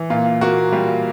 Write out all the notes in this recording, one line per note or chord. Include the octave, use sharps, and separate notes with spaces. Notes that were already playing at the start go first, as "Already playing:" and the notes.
Already playing: E3
A#2 F4
A#3 F#4
G3 F4